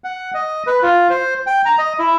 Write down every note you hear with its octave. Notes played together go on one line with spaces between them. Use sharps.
F#5
D#5
B4
F4
C5
G5
A#5
D#5
E4